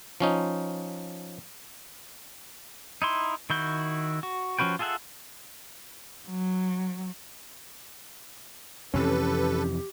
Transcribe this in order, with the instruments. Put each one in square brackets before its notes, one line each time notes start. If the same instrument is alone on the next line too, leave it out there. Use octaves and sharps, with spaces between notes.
[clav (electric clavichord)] F3 C#4 D#4
[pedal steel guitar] D#4 E4 C6
D#3 E4 F#4 G6
F#4
F3 C#4 F#4 B4 G5
F4 G#4 A4 E5 F#5
[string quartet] F#3
[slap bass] F2 C3 E3 [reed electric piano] C#4 [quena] G4 [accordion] A4 B4